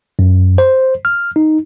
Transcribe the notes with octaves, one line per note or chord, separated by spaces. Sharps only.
F#2
C5
F6
D#4